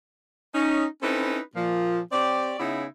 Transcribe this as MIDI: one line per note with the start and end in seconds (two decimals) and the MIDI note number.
0.55 0.85 61
0.55 0.85 63
1.03 1.39 60
1.03 1.39 61
1.03 1.39 63
1.03 1.39 64
1.03 1.39 69
1.03 1.39 71
1.56 2.00 46
1.56 2.00 53
2.12 2.56 60
2.12 2.56 67
2.12 2.56 73
2.12 2.56 74
2.60 2.86 49
2.60 2.86 59
2.60 2.86 63
2.60 2.86 64